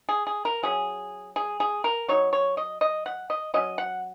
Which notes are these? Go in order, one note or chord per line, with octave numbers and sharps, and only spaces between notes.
G#4
G#4
A#4
F#3 C#4 G#4
G#4
G#4
A#4
F#3 D#4 C#5
C#5
D#5
D#5
F#5
D#5
F#3 C#4 D#5
F#5